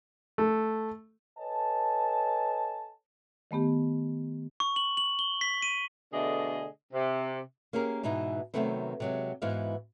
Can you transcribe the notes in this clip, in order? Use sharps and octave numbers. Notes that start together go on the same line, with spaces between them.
A3
A4 B4 C#5 D#5 G#5 A5
D#3 A3 B3 G4
C#6
F#7
F#7
G7
B6
D#7
B2 D3 A3 D4 G#4 D#5
C3
A#3 C#4 G4 G#4 A#4
G#2 B2 E3 D#4 E4
C3 D#3 F#3 A3 B3 C4
C3 F#3 G#3
G#2 E3 B3 E4 F#4 F5